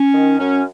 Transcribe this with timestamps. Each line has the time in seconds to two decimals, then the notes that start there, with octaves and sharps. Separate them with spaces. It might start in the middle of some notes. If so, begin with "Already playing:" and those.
Already playing: C#4
0.14 D#3
0.39 F#2 C#4